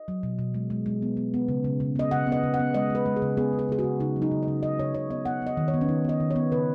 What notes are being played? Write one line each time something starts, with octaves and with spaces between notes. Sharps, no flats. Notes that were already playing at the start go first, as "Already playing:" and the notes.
Already playing: D#5
F#3
B2
B2
G#3
G#3
G#3
B3
B3
B3
C#3
C#3
C#3
B3 D#5
C#3 F#5
B3
D#5
C#3
F#5
B3
G#3 D#5
G#3 B4
G#3
G#4
C#3
B3 G#4
C#3
G#4
C#3 G#4
F#4
C#3
C#3 D#4
F#3
D#4
C#3
D#5
C#3
C#3 D#5
C#3 C#5
C#3 C#5
B3 D#5
B3 F#5
B3 D#5
D#3
C#5
B3
C#4
D#3 D#4
B3 D#5
D#3
C#5
B3
C#3 B4